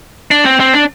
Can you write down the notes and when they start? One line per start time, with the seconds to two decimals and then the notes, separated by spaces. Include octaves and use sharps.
0.31 D4
0.45 C4
0.60 C4
0.74 D4